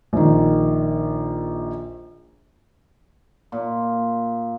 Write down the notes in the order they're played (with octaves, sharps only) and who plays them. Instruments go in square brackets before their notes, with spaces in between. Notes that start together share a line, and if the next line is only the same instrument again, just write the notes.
[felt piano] A#1 D#3
[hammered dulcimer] A#2